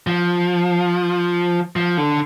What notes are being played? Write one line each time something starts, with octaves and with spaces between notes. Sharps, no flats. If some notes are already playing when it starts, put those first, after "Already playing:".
F3
F3
D3